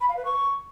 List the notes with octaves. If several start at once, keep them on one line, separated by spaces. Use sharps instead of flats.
B5
F5
B4
C#6